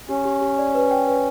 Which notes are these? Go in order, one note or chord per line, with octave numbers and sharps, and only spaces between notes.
C#4 G4
G4
G4
D5
B4
G5
B4